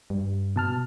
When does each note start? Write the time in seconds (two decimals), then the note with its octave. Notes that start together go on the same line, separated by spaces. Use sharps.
0.10 G2
0.56 B2 A5 F6